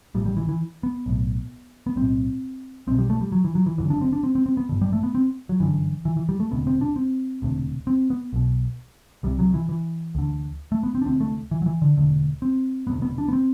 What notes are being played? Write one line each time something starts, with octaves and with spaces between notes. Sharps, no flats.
A1 A2 G3
G3
E3
E3
B3
B1 A2
B3
B1 A2 C4
B1 B2 C4
G3
A3
G3
F#3
E3
F#3
E3
F#1 F#2 D3 E3
D4
C4
D4
C4
C4
C4
B3
A1 G2 D3
G3
A3
B3
C4
F#3
G1 F#2 D3 E3
E3
E3
G3
A3
E1 D2 C3 B3
C4
D4
C4
E1 D2 C3
C4
B3
B1 B2
C2 C3 G3
F#3
E3
E3
D2 D3
A3
B3
C4
D4
D2 C3 C4
A3
E3
F#3
E3
D3
E1 D2 D3
C4
E1 D2 C3 B3
B3
D4
B3
C4